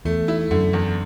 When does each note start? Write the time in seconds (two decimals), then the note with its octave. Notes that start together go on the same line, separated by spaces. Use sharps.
0.05 E2 A3
0.28 E4
0.51 F#2 D3
0.73 E2